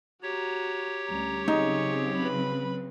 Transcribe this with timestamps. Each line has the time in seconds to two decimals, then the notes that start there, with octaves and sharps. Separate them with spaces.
0.23 F#4 G4 C#5 A#5
1.09 D2 G3 C#4 A#5
1.48 C#3 F#3 C4 D#4 G#4 C#6
2.17 B4 B5